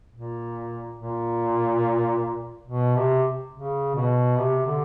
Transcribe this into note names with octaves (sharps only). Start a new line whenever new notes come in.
A#2
A#2
B2
C3
C#3
B2
C3
D3